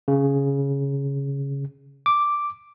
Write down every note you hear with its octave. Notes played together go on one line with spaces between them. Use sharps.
C#3
D6